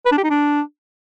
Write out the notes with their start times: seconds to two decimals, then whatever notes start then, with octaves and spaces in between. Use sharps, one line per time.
0.06 B4
0.12 D4
0.18 G4
0.24 D#4
0.30 D4